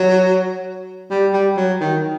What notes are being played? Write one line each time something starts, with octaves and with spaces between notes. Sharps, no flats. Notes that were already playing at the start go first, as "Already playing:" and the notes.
Already playing: F#3
G3
G3
F#3
D#3